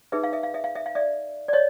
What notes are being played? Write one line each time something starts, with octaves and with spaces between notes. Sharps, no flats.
D#4 G#4 B4 E5
F5
E5
F5
E5
F5
E5
F5
D5 E5
D5
C#5 D#5